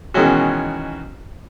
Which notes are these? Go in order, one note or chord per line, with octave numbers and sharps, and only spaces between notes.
B2 D#3 E3 G#3 C#4 F#4